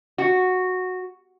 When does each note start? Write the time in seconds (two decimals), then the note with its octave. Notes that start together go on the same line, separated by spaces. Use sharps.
0.18 F#4